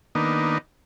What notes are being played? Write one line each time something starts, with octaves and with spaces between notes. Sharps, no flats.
D#3 A#3 B3 D4 D#4